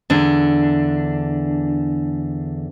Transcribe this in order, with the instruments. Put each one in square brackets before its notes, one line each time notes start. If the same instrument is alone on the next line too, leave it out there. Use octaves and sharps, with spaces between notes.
[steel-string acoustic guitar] E2 D3 D4